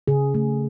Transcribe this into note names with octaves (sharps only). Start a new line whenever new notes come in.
C#3 G#4
A3